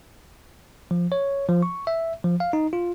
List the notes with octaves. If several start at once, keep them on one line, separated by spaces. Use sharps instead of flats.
F3
C#5
F3
C#6
E5
F3
F5
D#4
F4